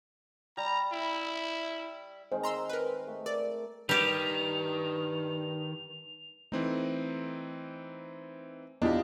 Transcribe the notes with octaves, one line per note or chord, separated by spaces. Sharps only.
G3 A#5
E4
D#3 G#3 C4 C5
A#5 C6 E6
A#4 B4
A3
A#4 D5
G2 D#3 G3 G4 F7
E3 A3 C4 D#4
E2 D4 F4 G4 D#5